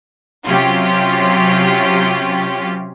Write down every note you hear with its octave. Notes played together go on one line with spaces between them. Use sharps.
C3 F#3 C#4 F4 G4